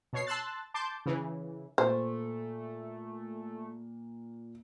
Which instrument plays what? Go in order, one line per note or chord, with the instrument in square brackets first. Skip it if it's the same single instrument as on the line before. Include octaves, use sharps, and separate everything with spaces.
[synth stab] B2 C#5 C7
A5 C6 E6 F#6 A6
A5 C6 D6 G6
C#3 E3
[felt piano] A#2 [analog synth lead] A3 [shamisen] C5